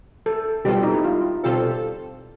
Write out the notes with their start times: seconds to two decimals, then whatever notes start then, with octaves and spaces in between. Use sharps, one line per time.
0.26 A4
0.64 B2 G3 C4 F4 G4 A4
0.83 D#4
0.94 E4
1.04 F4
1.43 B2 G3 C4 F4 A4